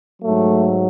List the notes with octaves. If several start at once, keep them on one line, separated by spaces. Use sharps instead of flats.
G#2 F#3 A3